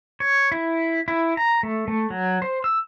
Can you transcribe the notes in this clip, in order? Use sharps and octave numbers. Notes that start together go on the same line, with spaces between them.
C#5
E4
E4
A#5
A3
A3
F#3
C5
E6